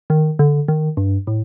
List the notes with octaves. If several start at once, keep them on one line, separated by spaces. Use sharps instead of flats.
D#3
D3
D#3
G2
A2